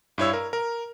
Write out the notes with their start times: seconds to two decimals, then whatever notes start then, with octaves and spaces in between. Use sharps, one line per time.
0.18 G2 E4 C#5 E6
0.33 A#4
0.53 A#4